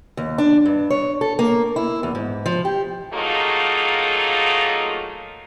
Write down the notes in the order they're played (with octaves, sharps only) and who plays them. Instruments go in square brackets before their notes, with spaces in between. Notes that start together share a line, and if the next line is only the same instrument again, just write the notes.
[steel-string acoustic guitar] D#2
D4
G2
C#5
A4
A#3
E4
E2
G#2
F3
G4
[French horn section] F#3 A3 A#3 D#4 F4 G#4